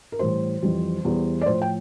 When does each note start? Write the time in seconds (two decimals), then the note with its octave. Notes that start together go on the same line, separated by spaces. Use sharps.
0.12 A#4
0.19 A2 E3 G3 C5
0.62 F2 E3 G3
1.05 E2 E3 G3
1.41 D5
1.46 A2 F3 C5
1.62 G5